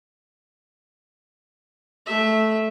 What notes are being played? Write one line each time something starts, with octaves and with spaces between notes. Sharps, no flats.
A3 E5